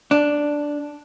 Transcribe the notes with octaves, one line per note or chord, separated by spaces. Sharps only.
D4